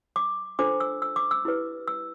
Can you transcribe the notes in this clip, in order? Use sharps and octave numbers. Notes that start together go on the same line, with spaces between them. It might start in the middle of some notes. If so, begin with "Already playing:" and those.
D6
D4 F4 A4 C5 D6
E6
E6
D6
E6
E4 G4 B4
E6